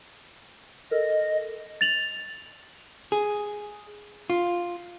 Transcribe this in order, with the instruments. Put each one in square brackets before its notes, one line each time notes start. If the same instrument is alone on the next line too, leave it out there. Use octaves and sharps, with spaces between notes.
[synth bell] A4 A#4 [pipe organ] D#5
[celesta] A6 F7 F#7
[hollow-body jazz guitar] G#4
F4